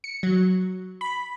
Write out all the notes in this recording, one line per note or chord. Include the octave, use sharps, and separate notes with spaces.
C#7
F#3
B5